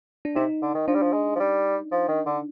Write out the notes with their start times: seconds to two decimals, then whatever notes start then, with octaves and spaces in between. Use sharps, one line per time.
0.25 D4
0.35 C3 D#4
0.62 D3
0.75 D#3
0.87 F3 D4
0.95 G3
1.02 F3
1.13 G#3
1.35 F3
1.40 G3
1.92 F3
2.08 D#3
2.26 D3